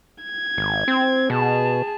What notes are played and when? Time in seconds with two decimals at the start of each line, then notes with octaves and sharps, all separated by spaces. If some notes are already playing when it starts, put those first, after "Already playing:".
0.23 G#6
0.58 G#1
0.88 C4
1.30 B2 G#4 A5